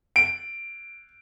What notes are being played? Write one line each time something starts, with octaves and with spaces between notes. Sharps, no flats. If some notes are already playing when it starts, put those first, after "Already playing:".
D7